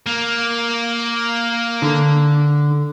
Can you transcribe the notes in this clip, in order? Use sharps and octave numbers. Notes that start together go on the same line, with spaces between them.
A#3
D3